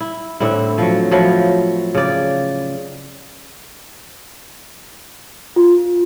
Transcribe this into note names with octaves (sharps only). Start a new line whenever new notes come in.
E4
A2 D3 C4 E4
F3 F#3
F3 F#3 E4
C#3 D5
F4